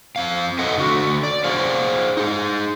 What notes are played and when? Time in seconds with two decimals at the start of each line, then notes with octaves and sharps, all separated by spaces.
0.16 F2 C4 F5
0.59 A4 D#5 F#5
0.78 D3 F#4
1.23 D5
1.44 G#4 C5 F5 F#5
2.17 D#4 G#4